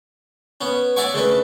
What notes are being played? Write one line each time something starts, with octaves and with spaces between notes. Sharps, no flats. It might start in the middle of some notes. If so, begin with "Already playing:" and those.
B3 C#4
C#5 D5 E5 F#5 G#5 C#6
C#3 A3 D4 B4